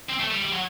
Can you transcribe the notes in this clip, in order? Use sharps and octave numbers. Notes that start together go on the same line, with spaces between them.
C4
A3
G3
G3
F#3